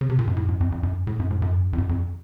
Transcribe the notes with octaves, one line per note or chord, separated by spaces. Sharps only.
C#3
C3
A#2
F#2
A2
F#2
F2
F2
F#2
A2
F#2
A2
F#2
F2
F#2
F2